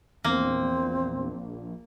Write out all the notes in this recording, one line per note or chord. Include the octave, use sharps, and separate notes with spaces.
A#1 E2 A#3 C4